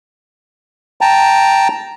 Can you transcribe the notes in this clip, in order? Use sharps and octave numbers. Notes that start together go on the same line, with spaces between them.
G5 A5 A#5